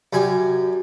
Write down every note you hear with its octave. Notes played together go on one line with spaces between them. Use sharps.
F#2 G3 G#5